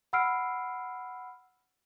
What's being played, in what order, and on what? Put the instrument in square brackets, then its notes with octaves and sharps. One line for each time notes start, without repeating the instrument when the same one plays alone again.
[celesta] F#5 B5 E6 F6 C7 D7